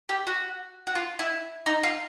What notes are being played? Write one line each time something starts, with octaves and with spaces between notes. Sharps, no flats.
G4
F#4
F#4
F4
E4
D#4
F4